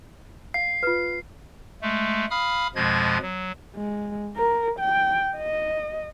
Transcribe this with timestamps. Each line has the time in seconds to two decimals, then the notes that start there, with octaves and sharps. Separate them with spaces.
0.54 F5 C7
0.83 F4 B4
1.82 G#3 A3
2.31 F5 B5 D#6 F6
2.75 F2 B2 F3 G#3 D#5 G#6
3.22 F#3
3.76 G#3
4.37 A#4
4.79 G5
5.37 D#5